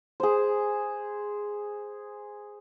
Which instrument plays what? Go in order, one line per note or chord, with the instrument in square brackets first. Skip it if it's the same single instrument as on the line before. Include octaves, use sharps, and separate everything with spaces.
[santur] G#4 C5